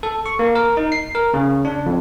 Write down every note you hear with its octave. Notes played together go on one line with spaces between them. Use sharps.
A4
C#6
A#3
A#4
D#4
C7
A#4
C#3
D4
F2